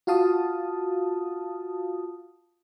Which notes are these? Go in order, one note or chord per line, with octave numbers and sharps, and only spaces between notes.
F4 F#4 F5 A5 D#6